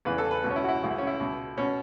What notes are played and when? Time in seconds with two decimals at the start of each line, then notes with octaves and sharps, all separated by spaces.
0.05 E2 C#3 E3 B4
0.18 A4
0.31 B4
0.43 C#2 B2
0.50 C#4
0.56 E4
0.64 F#4
0.68 E4
0.82 C#2 C#3 E3 F#4
0.91 E4
0.98 C#4
1.07 E4
1.20 C#2 B2
1.57 B2 C#4